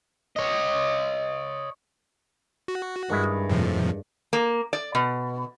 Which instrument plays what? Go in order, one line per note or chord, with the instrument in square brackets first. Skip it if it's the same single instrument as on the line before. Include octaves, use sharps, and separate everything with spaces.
[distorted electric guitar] C#5 D#5
[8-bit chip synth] F#4
[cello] G2 [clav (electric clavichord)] D#3 G#3 E4
[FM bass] F2 [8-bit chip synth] A2 C3 F3
[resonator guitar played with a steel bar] A#3
D5
B2